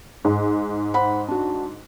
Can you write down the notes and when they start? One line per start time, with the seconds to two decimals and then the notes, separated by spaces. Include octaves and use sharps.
0.25 G#2
0.94 C5 F#5 B5
1.28 D4 F#4